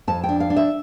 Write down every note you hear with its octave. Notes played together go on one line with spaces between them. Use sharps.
F2 A5
G5
D4
F5
D4
E5